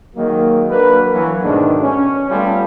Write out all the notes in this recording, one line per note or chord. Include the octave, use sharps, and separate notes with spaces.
D#3 F#3 G#3 A#3
F#3 A#3 D4 A#4 B4
E3 F#3 A#3
G#2 B2 D#3 G#3 A3 D4
C#4
G3 A3 B3 C#4 F4 A4